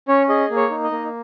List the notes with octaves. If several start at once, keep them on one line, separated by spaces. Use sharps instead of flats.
C#4 C#5
G#4 D#5
A#3
C#5
D#4
D#5
A#3